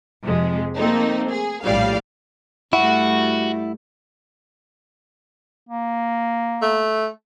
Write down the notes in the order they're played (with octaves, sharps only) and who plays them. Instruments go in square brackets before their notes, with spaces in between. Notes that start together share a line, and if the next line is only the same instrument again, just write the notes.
[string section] F2 C3 F3 G#3
A3 A#3 C4 D#4
G#4
A#1 A2 G3 D5 F5
[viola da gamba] G2 G3 A3 [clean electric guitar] E4 F#5 [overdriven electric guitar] F#4
[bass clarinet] A#3
[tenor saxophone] A3